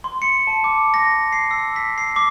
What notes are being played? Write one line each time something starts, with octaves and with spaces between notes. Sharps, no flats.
C6
C#7
A5
D6
A#6
C7
E6
B6
C7
D6